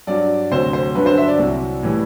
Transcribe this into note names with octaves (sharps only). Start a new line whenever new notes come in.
G2 F#3 D5
D2 C3 F#3 C5
C5
G2 D3 F#3 B4
C5
E5
D5
C2 C3 F#3
A2 E3 G3